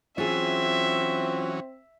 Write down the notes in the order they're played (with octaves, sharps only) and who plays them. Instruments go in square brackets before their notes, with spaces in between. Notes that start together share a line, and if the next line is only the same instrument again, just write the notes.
[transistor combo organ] E3 F#3 C#4 [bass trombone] C4 [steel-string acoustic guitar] F4 G#4 [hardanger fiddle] E5